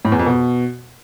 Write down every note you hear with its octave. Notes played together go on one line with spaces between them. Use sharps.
A2
E2
F2
B2